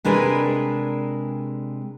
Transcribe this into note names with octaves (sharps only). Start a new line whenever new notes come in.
C3 G#3 D4 A#4 B4 G#5